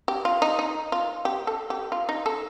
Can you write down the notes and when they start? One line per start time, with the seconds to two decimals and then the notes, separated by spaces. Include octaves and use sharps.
0.08 G4
0.25 F4
0.42 D#4
0.59 D#4
0.92 F4
1.25 G4
1.47 A4
1.70 G4
1.92 F4
2.09 D#4
2.26 A4